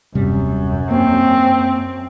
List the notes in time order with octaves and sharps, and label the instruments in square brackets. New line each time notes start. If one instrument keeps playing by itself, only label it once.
[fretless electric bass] D#1 C3 G3 [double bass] F#2
[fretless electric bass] A#3 [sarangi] C4